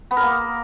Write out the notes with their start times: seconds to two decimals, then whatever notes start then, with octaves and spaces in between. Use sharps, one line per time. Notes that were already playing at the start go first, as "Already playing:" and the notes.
0.11 B3
0.17 A#4
0.23 A#3